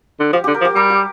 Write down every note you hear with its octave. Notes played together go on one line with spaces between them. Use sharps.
D3
F3 G4
D3 G4
A#4
F3
G4
G3 A#4
G4